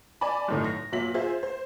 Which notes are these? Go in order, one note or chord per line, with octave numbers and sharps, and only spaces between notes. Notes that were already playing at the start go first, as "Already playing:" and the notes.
D5 G#5 A5 B5
F#2 A2 D#3
A#6
A#2 F#3 E5 B6 F#7
F4 G#4 C5 E5
C5